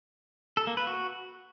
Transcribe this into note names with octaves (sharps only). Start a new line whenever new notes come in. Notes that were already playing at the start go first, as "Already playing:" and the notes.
A4
A#3
B4
F#4